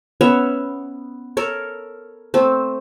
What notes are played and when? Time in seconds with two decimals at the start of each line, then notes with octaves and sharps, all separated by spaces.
0.21 B3 C#4 C#5 E5
1.37 A4 A#4 C#5
2.34 A3 C4